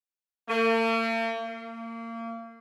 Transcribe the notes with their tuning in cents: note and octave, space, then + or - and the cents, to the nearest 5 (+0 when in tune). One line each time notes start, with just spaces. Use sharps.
A#3 -45
A#3 -30